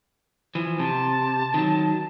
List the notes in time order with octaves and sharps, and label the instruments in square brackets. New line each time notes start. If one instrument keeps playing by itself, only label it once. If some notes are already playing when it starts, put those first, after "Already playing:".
[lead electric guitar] E3 F3
[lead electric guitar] C3 [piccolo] A5
[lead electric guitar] D#3 F#3